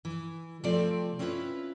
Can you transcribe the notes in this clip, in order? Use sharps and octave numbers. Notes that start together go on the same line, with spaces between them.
E3
C3 F3 A3 C4 F4 D5
C4 C#4 E4 F4 B4